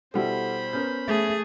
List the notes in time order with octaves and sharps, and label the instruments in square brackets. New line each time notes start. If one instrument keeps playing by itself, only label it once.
[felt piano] B2 G3 E4 [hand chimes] A4 F#5 [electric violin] C5 B5
[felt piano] B3 C#4 A#4 [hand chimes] G6
[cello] A3 G#4 [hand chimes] E5